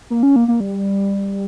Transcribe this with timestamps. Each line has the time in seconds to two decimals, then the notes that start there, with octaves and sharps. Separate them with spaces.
0.10 A#3
0.23 C#4
0.36 A#3
0.48 A#3
0.60 G3